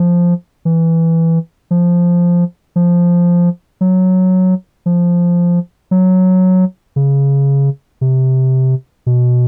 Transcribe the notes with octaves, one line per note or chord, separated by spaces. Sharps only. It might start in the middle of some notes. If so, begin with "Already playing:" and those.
Already playing: F3
E3
F3
F3
F#3
F3
F#3
C#3
C3
B2